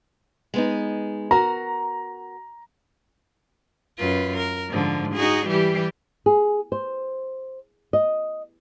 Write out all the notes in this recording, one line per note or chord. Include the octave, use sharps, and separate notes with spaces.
G#3 B3 D#4
F#4 A#4 A#5
F#2 F4 B4
A#4
G#2 D3 F3
D#4 F#4 G#4
E3 G3 G4
G#4
C5
D#5